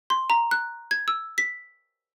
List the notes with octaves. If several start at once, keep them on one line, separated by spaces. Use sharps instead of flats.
C6
A#5
F#6
G#6
E6
B6